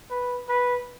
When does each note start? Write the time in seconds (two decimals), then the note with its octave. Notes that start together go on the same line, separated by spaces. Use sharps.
0.10 B4
0.49 B4